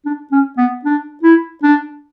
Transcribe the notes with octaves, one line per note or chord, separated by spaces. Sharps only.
D4
C#4
B3
D4
E4
D4